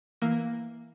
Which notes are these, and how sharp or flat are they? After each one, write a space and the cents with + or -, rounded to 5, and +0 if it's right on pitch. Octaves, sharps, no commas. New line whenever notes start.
E3 +0 A#3 +0